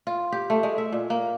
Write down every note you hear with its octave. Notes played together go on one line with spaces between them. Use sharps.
F4
G4
A3
G#3
E5
A#2
A#3